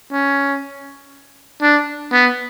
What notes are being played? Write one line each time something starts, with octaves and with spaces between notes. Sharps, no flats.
C#4
D4
B3